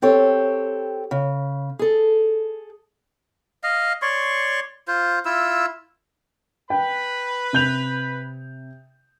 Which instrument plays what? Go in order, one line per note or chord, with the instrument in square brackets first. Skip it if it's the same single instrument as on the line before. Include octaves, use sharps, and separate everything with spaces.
[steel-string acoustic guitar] C4 G4 A4 C#5
C#3
G#4 A4
[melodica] D#5 F5
C#5 D5 C6 C#6
F4 C5
E4 F4 E6
[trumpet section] B4 B5 [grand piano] G5
[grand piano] C3 G6 F7